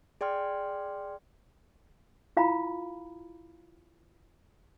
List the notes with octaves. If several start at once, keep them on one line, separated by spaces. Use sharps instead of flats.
G#4 D5 G5 C6 F6
E4 F4 F5 A#5 B5